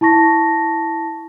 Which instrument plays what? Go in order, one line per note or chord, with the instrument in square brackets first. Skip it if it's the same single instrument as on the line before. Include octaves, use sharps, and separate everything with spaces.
[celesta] E4 A5 C#6 A#6